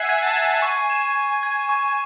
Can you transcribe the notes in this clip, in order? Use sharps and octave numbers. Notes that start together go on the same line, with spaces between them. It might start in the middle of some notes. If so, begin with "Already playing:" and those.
Already playing: E5 F#5 G#5 C7
G#6
A5
G#6
G#5 C#6
E7
C7
G#6
C#6